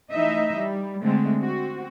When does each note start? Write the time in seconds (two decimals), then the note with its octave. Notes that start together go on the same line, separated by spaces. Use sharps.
0.11 E3 A3 D#4 D#5 E5
0.56 G3
1.02 D3 G#3 A3 C4 D4
1.40 C4 F#4